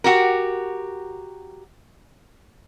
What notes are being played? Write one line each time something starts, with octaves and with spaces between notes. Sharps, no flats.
F#4 G4 A#4